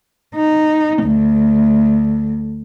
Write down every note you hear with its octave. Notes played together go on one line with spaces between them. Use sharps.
D#4
D2